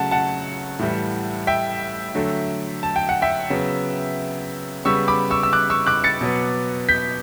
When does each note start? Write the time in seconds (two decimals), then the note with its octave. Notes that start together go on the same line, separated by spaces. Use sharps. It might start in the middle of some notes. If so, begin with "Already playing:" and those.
Already playing: C#3 F#3 A3 F#5 A5
0.11 F#5 A5
0.79 A2 E3 G3
1.47 E5 G5
2.15 D3 F#3 A3
2.83 A5
2.96 G5
3.09 F#5
3.22 E5 G5
3.50 C#3 F#3 B3
4.85 C#3 G3 B3 C#6 E6
5.08 B5 D6
5.30 C#6 E6
5.43 E6
5.53 D6 F#6
5.70 C#6 E6
5.87 D6 F#6
6.04 A6 C#7
6.21 B2 F#3 B3
6.89 G6 B6